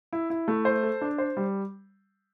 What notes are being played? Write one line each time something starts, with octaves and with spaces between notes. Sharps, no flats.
E4
E4
A3
C5
A4
D4
C5
G3